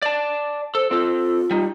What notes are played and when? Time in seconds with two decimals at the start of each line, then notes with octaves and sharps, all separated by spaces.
0.02 D5 A5
0.75 A4 C5
0.91 C4 F4 A4
1.51 G3 D#4